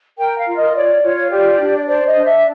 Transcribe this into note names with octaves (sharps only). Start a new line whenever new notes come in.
A#4 G5
F5
F4
D#5
C#5 D5
F4 C#5
G4 D5
D4
C5 D5
D#5
D4
E5